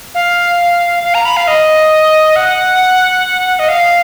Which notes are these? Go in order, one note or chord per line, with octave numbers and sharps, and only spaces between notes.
F5
F5
A#5
B5
F5
D#5
F#5
D#5
F5